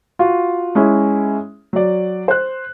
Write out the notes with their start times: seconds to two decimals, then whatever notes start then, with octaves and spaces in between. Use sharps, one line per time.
0.19 F4 F#4
0.75 G#3 C#4 E4
1.73 F#3 D5
2.28 C5 F#6